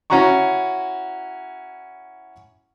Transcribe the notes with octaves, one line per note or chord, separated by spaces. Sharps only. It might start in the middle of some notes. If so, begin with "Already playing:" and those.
C#4 E4 F#4 A#5 C#6